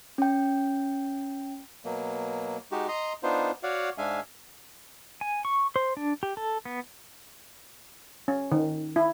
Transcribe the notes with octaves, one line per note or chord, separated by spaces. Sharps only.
C#4 G5
B2 F#3 A#3
G#3 D#4 F#4 G4
D#5 A#5 C6
B3 D4 D#4 F4 C5
F#4 C#5 D5 F5 F#5
G#2 G#3 D4 E5 F5 G#5
G#5
C#6
C5
D4
G4
A4
B3
C#4
D#3
E4